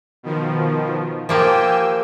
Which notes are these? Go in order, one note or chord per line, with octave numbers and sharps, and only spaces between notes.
B2 D#3 F3
F3 A#3 G4 G5 G#5 E6